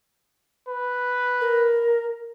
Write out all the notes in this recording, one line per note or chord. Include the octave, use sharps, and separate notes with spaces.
B4
A#4